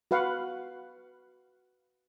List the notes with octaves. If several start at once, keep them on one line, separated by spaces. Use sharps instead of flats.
F#4 B4 F5 F#5